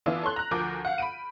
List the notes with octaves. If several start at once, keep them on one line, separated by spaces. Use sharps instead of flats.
E3 B3 D4 E4 F4
A4 C#5 C6 F#6
A#5 F#6
D2 F3 A#4 D6 G6
F5 F#5
B5 D7 D#7